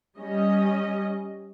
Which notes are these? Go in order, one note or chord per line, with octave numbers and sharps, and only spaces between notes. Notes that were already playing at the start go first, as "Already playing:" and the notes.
G3 C#4 D#5